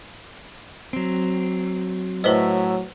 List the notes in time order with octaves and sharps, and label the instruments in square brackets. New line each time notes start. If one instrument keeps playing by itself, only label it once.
[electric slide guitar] F#3 C4
[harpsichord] A2 E5 [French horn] F#3 [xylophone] B4 C5 D#5